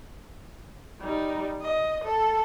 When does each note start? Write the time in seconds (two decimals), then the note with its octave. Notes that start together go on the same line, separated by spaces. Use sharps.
1.00 G3 D#4
1.61 D#5
2.04 A4